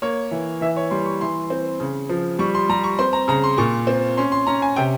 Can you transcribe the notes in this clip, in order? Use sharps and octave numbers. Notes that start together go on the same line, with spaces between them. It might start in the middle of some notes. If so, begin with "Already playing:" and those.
A#3 C#5
E3
E3 E5
C#5
G3 C6
C#6
E3 C6
C4
C#3
F3
G3 C#6
C6
G3 A#5
C#6
C4 C6
A#5
C#3 A#5
C6
A#2 C#6
C4
C#4 C6
C6
C#4 A#5
G#5
C3 G5